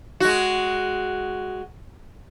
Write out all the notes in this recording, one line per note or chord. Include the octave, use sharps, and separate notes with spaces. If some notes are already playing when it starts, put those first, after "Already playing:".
G#3 F#4